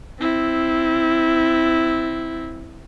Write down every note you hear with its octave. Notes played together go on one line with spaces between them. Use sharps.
C4 E4